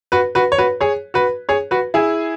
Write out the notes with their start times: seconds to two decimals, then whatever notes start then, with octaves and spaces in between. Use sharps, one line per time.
0.12 F#4 B4
0.35 F#4 B4
0.52 C#5
0.58 F#4 B4
0.81 G#4 C#5
1.14 F#4 B4
1.49 G#4 C#5
1.71 F#4 B4
1.94 E4 G#4